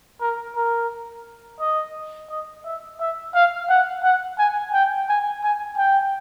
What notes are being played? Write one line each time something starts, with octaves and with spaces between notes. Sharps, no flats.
A#4
A#4
D#5
D#5
E5
E5
F5
F#5
F#5
G#5
G5
G#5
G#5
G5